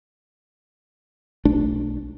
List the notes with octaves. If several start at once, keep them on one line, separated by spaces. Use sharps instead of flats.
B1 A3 D4